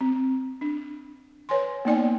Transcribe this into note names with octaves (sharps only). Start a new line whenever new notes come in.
C4
D4
B4 C#5 G#5 C6
A#3 B3 D#4 D5 G5 G#5